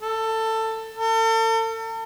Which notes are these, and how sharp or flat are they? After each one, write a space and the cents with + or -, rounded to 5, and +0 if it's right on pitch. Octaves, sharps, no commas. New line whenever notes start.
A4 +15
A4 +40